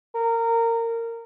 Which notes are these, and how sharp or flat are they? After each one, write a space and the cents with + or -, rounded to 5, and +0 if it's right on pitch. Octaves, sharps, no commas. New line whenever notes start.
A#4 -20